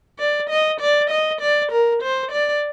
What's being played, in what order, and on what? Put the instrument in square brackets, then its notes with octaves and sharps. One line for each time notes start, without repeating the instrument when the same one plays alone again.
[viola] D5
D#5
D5
D#5
D5
A#4
C5
D5